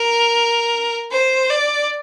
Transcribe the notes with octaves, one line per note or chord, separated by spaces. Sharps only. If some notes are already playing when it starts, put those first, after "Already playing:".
Already playing: A#4
C5
D5